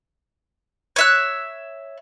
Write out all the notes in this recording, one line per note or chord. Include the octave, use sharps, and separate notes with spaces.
C#5 E5 F#6